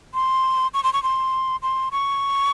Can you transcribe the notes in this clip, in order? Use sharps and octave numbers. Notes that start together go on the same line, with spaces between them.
C6
C#6
C6
C#6
C6
C6
C#6